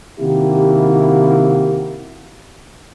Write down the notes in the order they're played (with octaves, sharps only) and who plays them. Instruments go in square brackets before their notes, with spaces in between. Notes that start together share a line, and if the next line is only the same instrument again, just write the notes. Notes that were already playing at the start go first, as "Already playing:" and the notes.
[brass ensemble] C3 D#3 A#3 E4 F#4 G4